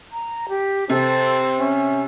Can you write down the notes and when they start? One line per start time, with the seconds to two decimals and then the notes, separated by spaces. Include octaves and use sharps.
0.12 A#5
0.49 G4
0.89 C3 C4 A4
1.59 C#4 E5